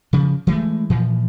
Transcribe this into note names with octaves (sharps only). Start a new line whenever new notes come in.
C#3 F3
E3 F#3 G#3 A3
A#2 E3 F3